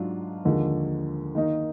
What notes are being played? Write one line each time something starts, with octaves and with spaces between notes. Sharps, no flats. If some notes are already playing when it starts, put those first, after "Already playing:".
Already playing: G#2 F#3 D4 F4
D#2 D3 F3 G#3
D#3 A#3 D#4